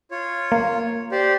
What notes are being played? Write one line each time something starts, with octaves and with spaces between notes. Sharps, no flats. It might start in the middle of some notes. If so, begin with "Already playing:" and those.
F4 C#5
A#3
G4 C5 D5